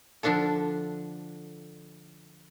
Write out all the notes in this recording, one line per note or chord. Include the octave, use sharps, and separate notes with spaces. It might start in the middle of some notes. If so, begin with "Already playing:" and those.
D3 F3 D4 F4 A4